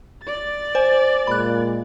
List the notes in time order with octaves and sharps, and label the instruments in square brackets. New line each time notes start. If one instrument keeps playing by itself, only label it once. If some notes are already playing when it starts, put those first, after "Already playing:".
[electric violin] D5 A6
[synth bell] C5 G#5
[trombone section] A#2 G#3 [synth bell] B5 F#6